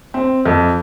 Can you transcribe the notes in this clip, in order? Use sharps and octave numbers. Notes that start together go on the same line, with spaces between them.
C4
F2